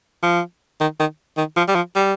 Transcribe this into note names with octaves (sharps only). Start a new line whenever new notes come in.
F3
D#3
D#3
D#3
F3
G3
F3
G3